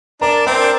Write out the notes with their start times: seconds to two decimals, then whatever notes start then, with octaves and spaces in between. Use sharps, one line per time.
0.21 D4 A#4 A#5
0.46 C4 A#4 A#5
0.60 D4